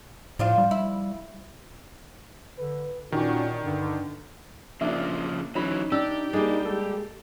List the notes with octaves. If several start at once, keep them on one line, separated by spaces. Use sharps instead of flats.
A2 F3 D4 F4
G3
E4
D3 B4
A#2 D#3 C#4 D4 F#4 G4
G2 D3
C#3 F3 A#3 D4 E5
E3 F#3 C#4 D#4 B5
D4 G4 E6
G3 A#3 D4 G#4 D#5
G#3 A4